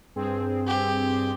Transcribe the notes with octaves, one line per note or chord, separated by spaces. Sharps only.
G2 C4 G#4
G4